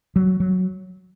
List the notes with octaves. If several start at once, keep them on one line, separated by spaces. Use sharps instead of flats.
F#3
F#3